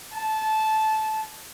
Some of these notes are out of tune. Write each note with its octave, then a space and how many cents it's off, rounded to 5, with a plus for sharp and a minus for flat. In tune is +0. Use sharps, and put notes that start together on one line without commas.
A5 -15